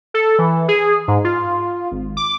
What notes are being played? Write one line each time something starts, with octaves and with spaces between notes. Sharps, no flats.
A4
E3
G#4
G#2
F4
G#1
D6